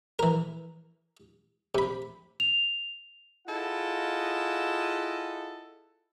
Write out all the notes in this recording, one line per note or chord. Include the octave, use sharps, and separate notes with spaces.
E3 A#4
C3 B5
F7
E4 F4 G#4 A4 D#5 F#5